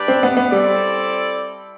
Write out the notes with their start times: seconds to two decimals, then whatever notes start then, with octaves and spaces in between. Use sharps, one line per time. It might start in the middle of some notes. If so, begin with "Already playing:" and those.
Already playing: G3 D4 G4 B4 D5
0.08 C4
0.23 B3
0.37 B3
0.52 G3 C4 E4 A4 D5